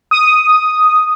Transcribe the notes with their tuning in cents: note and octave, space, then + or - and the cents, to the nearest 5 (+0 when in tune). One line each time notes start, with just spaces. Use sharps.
D#6 +0